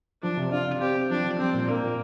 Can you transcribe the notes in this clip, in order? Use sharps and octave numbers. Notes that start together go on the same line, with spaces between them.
F3 D4
C3
D4 F4
C3
C4 G4
C4
F3 D4
F3
G3 C4
A#2
A#3 D4
A#2